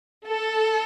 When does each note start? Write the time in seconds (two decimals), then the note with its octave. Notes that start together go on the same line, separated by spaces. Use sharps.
0.26 A4